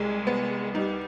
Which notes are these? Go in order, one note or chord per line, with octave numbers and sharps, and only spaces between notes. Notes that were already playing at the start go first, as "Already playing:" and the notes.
Already playing: C2 G#3
B3
G3 D#4